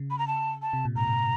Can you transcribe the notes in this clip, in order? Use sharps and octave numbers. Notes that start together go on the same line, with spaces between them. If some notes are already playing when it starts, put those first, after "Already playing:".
Already playing: C#3
B5
A#5
A5
A5
C3
A#2
G#2 A#5
G#2